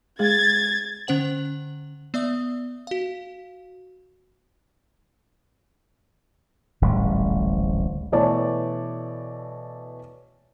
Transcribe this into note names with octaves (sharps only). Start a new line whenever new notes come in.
G#3 G#4 G#6 A6
D3 C#4 C5 F#5 F#7
B3 D5 E5 D#6
F#4 F5
D1 A1 G#2 G3
B2 E3 A3 C#5 D5 A5